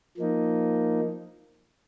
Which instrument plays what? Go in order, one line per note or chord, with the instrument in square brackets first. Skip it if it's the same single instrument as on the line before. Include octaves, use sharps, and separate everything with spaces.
[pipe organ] F3 A#3 D#4